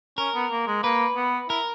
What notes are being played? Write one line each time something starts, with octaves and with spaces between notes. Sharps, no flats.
C#4 A#4
B3
A#3
G#3
A#3 B4
B3
E4 A#4